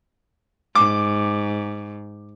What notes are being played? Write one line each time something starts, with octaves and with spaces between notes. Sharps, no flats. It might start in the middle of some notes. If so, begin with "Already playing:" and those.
G#2 D6